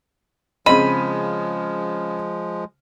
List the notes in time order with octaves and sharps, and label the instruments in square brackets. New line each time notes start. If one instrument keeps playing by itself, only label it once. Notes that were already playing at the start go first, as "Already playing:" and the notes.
[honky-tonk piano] C#3 D#7 [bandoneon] F3 G#3 [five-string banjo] C4 D#5 [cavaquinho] B5